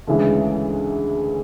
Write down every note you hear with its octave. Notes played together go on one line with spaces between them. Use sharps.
D2 C#3 E3 G#3